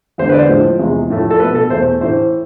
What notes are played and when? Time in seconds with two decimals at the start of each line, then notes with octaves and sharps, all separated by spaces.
0.18 E2 D3 G#3 C5
0.29 B4
0.34 D5
0.39 C5
0.49 A2 F3 G#3
0.79 E2 C3 G#3
1.10 A2 F3 A3
1.31 A4
1.40 B2 A3 B4
1.55 A4
1.70 E2 B2 A3 C5
2.01 A2 E3 A3 C5